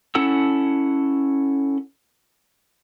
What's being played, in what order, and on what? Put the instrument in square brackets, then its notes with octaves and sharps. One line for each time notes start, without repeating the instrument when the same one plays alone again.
[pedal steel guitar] C#4 E4 A4 F#5 E6